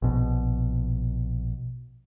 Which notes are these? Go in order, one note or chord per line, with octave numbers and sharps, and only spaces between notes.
A#1 B2